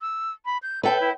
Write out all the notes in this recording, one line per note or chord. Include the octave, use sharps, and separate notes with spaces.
E6
B5
G6
A4 B4 G5
E4